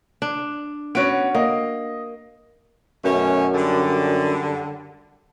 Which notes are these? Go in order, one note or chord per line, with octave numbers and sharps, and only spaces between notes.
D4
B3 C#4 F#4 D7
A#3 D#5
F#2 B2 A3 C#4
D3 G3